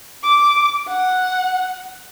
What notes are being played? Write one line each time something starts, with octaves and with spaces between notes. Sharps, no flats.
D6
F#5